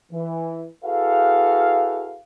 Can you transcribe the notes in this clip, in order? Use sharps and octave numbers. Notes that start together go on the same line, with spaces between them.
E3
E4 F#4 G#4 A4 B4 F5